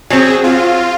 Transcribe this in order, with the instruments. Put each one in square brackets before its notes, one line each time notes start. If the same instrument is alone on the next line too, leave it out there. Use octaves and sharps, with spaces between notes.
[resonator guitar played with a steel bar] F#3 C4 [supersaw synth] G#4
[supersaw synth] F4